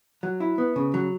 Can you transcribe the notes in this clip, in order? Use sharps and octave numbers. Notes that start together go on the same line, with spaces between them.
F#3
E4
B3
C#3
F#3